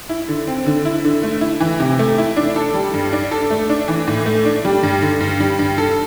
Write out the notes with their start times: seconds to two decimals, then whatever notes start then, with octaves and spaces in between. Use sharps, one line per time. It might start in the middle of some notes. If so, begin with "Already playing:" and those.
0.09 E4
0.28 D3
0.47 C4
0.66 D3
0.85 E4
1.04 D3
1.23 A3
1.41 E4
1.60 E3
1.80 C3
1.99 A3
2.18 E4
2.36 D4
2.56 A4
2.74 G3
2.94 G2
3.12 D4
3.31 A4
3.50 A3
3.69 D4
3.88 E3
4.08 A2
4.26 A3
4.45 D4
4.65 G3
4.83 G2
5.02 D3
5.20 G2
5.40 G3
5.59 G2
5.78 A4